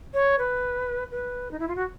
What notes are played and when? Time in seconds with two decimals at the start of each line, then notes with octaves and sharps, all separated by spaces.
0.13 C#5
0.38 B4
1.11 B4
1.51 D#4
1.59 E4
1.68 F4
1.75 F#4